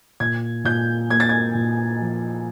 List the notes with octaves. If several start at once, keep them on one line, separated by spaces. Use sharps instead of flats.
A#2 G#6
A#2 G6
A#3 G#6
A6
G#6
A#2
F3